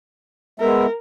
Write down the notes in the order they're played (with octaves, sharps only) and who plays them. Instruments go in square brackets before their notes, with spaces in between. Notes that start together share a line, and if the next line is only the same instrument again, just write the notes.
[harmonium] G#3 B3 E5 [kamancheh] A#4